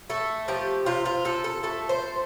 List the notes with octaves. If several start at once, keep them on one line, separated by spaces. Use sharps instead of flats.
A3 A4
F3 G4
C3 F4
F4
F3 A4
A4
A3 A4
C5
A3